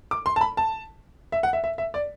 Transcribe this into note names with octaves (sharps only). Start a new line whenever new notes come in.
D6
C6
A5
B5
A5
E5
F#5
E5
E5
E5
D5